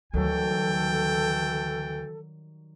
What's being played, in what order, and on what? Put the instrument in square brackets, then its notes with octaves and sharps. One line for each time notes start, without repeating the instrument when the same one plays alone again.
[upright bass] D2 [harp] D#3 F#3 G3 [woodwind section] E3 F#4 A4 [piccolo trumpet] G5